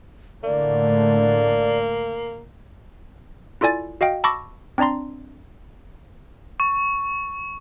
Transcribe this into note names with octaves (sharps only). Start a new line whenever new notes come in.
A2 D3 A3 A#3 D5
E4 F4 A4 D5 G#5 A6
F#4 D#5 F5 G5
A5 B5 C#6 D6 E6 A#6
C4 D4 D5 A#5 C6
C#6